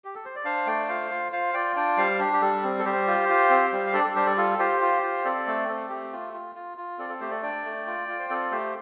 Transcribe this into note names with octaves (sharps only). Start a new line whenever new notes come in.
G4
A4
C5
D5
D4 C5 F5
A3 D5 G5
F4 C5 F5
F4
F4 C5 F5
F4 D5 G5
D4 D5 G5
G3 C5 F5
D4 G4
G4
G3 A4
C4
A4
G3 G4 C5
F4
F4
C4
G3
F5
D4 A4 D5
A4
G3 G4 C5
A4 D5
F4 A4
F4 G4 C5
F4
F4
C4 A4 D5
A3
C4 A4
A3 G4
F4
F4
F4
F4
C4 A4 D5
A4
A3 G4 C5
A4 D5
D4 D5 G5
A3
F4
F4
C5
C4 A4 D5
A3 G4 C5